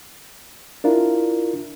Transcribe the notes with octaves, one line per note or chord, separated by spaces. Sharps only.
D4 E4 F4 A#4